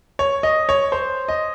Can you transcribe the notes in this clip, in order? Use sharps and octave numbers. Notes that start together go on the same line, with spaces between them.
C#5
D#5
C#5
C5
D#5